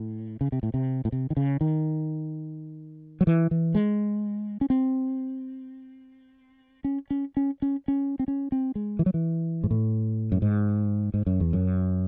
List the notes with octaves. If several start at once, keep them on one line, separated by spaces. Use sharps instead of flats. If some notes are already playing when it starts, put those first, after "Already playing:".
Already playing: A2
C#3
C3
A2
C3
A2
C3
D#3
C#3
D#3
F#3
E3
E3
G#3
C#4
C4
C#4
C#4
C#4
C#4
C#4
C4
C#4
C4
G#3
E3
F#3
E3
G#2
A2
F#2
G#2
G#2
F#2
E2
F#2